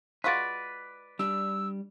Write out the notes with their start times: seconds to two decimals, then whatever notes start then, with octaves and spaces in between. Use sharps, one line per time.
0.24 G#3 F4 F#4 B4 D5
1.19 G3 D4 E6